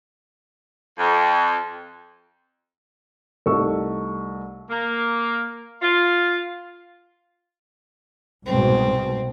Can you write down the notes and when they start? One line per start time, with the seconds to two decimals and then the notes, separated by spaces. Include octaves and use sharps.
0.98 F2
3.46 C2 A3 D#4 C#6 E6
4.70 A#3
5.82 F4
8.46 C2 G#2 B2 C4